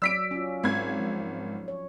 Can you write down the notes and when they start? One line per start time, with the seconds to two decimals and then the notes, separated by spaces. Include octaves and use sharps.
0.02 F#3 D5 E6 B6 D7
0.31 C#4 F4
0.64 G#1 G#6
1.00 F3
1.68 C#5